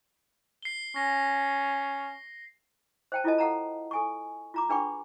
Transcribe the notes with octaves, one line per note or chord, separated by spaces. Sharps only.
C7 G7
C#4 A#6
C5 G5 A5
E4 F4 A4 D#5 A5
A4 F5 F#5 A5 A#5
A4 G#5 C#6
F4 A#5 D6
D4 G#4 B4 G5 B5 C#6